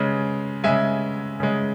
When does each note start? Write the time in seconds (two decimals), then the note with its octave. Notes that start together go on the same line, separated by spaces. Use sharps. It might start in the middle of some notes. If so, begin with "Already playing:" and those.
Already playing: C#3 G#3
0.64 C#3 G#3 E5 G#5
1.40 C#3 G#3